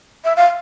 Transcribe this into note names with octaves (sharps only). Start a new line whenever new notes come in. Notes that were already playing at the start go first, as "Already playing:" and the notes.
E5
F5